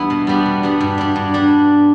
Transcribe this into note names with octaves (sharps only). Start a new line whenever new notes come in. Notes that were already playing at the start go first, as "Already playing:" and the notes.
Already playing: E2 G3 B3 D4 E4
B2
G3 B3 D4
B2
G3 B3 D4
G2
G3 D4
G2
G3 D4